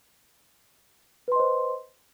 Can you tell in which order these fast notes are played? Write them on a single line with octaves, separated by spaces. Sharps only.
B4 C6 D#5 C5